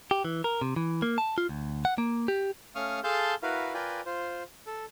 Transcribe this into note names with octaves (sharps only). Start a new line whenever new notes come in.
G4
E3
A#4
C3
E3
A#3
A5
F4
D2
F#5
A#3
G4
A3 C#4 F5 C#6 D#6 F6
G#4 A4 F5 A5 C6 G6
E4 F#4 A#4 B4 F5
F4 A#4 B4 D5 G5 G#5
F4 C5
A4